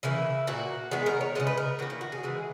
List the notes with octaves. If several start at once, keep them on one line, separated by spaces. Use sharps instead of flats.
C#3 E3 A#3 E4
A#2 A#3 F#4
D#3 G#3 B3 G#4
A#4
C#5
C#3 E3 G#3 D#5
B4
A#4
D#3 A#3 F#4
E4
F#4
G#4
C#3 E3 G#3